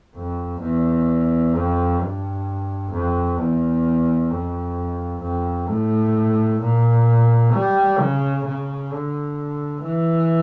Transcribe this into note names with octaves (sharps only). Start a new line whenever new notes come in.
F2
E2
F2
G2
F2
E2
F2
F2
A2
A#2
G3
C#3
C#3
D3
E3